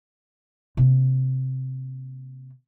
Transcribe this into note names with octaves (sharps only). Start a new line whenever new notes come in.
C3 A#3